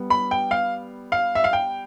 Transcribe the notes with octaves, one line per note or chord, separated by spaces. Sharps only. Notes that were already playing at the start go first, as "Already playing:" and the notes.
Already playing: G3 B3
B5
G5
F5
F5
E5
F5
G5